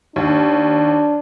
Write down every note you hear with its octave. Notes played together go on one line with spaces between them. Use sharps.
D#2 D4